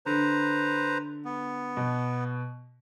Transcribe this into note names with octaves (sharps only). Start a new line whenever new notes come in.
D3 B4 C5 A#5
B3
B2